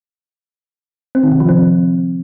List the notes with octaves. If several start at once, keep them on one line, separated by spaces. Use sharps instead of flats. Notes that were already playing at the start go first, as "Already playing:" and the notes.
C4
D#3
C3
F3
C4